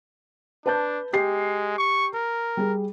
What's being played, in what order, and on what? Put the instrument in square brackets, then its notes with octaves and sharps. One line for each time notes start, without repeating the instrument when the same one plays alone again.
[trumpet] D4 [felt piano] B4 A5 G6
[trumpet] G#3 [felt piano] G4 C7
[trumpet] C#6
A#4
[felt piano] G3 G#4